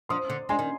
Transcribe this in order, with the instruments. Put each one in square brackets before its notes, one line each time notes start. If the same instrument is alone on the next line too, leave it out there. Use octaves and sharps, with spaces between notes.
[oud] F3 [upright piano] C6 D#6
[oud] D3
[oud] G#3 [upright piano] G#5 C6
[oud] D#3